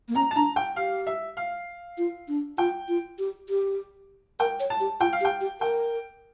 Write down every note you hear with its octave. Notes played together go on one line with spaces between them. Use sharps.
A#3
C#4 A#5
A5
D4 A#5
G5
G4 F5
E5
F5
F4
D4
F4 G5
F4
G4
G4
A#4 G5
C#5
A5
G4
F4 G5
F5
G4
G5
G4
A#4 G5